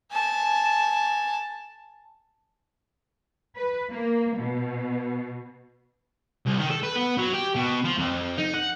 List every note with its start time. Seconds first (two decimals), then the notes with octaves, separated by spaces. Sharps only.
0.12 G#5 A5
3.56 B4
3.91 A#3
4.37 B2
6.46 C2
6.59 D#3
6.70 A4
6.84 B4
6.96 B3
7.19 F#3
7.34 G4
7.56 B2
7.85 F3
7.99 F2
8.38 D#4
8.54 F#5